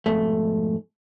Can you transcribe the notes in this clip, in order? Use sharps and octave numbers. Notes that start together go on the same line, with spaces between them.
F2 G#2 B2 A3